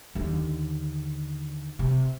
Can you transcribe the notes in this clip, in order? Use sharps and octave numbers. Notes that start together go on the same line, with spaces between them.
D#2 D3
C3